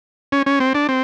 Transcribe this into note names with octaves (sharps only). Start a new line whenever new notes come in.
C#4
C#4
C4
D4
C4